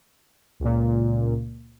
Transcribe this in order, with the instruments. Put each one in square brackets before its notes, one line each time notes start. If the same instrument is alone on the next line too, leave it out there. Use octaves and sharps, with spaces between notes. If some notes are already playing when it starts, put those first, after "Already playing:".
[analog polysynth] C#2 A#2